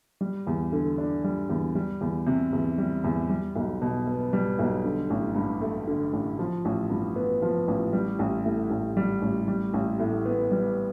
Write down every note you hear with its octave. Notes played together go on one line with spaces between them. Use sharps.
G3
E2
D3
D4
G3
E2
G3
E2
C3
E2
G3
E2
G3
B1
B2
B3
G3
B1
D3
A1
G2
A3
D3
A1
F3
A1
G2
B3
F3
A1
G3
A1
A2
A1
G3
A1
G3
A1
A2
B3
G3